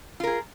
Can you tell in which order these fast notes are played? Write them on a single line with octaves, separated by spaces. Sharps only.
F4 A#4 G#4